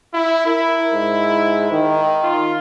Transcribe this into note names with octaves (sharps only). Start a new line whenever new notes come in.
E4
E4 A#4
G#2
D#3
F4